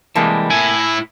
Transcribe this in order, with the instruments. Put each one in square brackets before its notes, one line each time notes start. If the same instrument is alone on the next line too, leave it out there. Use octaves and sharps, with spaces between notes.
[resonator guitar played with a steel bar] C3 A#3 A5 [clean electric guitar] E3 G3 G#3
[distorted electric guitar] A2 E4 [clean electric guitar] G#5